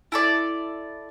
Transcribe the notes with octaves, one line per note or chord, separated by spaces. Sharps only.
E4 A4 D5